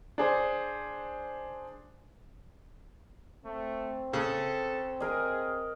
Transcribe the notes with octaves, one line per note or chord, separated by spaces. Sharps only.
D4 G#4 C5
A3 C4
C#3 A4
G#4 A#4 D#5